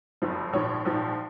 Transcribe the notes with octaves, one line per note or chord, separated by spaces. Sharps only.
F#1 F2 F3
A#1 G#2 F3 C#5
A#1 G#2 F3